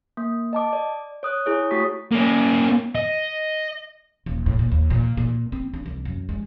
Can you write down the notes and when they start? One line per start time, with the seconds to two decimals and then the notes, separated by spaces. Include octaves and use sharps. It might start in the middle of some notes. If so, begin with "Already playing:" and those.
0.17 A#3
0.53 D#5 A5 D6
0.73 D5
1.23 C#5 D#6 F#6
1.46 E4 G#4 C#5
1.71 A3 F#4 G4 C#6 D#6 B6
2.12 A#3 C#4
2.95 D#5
4.26 D#1
4.46 A2
4.59 A#2
4.72 D#2
4.90 A#2
5.17 A#2
5.52 C4
5.74 D4
5.86 C2
6.05 F#2
6.29 G#3